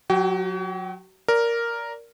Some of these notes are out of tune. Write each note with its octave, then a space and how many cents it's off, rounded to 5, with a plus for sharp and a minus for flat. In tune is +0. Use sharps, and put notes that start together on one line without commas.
F#3 -25 F#4 +40 G5 +0
A#4 +0 D5 -20